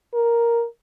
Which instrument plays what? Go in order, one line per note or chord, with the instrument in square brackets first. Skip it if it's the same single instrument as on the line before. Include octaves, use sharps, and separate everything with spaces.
[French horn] A#4